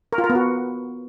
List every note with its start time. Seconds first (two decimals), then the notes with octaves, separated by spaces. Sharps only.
0.13 A#4
0.18 F4
0.24 A#4
0.30 B3
0.35 F#4